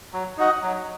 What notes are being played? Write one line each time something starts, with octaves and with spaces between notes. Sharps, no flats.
F#3
D#4 F#4 D#5
F#3